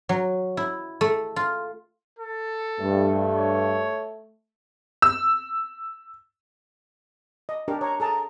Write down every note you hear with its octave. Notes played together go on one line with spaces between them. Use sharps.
F#3
E4
A3
F4
A4
G2 A3
C#5
E6
D#5
D4 G4 A#4
C#5 A#5
G#4 A4 A5 A#5